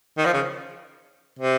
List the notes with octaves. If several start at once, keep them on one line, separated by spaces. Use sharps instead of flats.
D#3
F3
C#3
C3